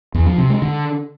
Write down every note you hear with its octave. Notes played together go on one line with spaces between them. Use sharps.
E2
F3
C3
G#3
D3